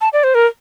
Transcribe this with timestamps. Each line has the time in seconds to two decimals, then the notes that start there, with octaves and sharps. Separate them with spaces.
0.01 A5
0.13 D5
0.24 C5
0.35 A#4